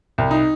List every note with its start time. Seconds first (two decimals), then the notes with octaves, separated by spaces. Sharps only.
0.18 C2
0.31 D#4